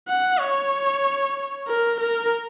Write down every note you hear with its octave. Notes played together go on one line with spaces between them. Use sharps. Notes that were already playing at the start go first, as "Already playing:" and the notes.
F#5
C#5
A#4
A#4